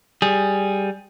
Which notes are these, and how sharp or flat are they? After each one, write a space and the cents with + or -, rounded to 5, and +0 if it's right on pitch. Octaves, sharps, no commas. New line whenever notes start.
G3 +0 G#4 +0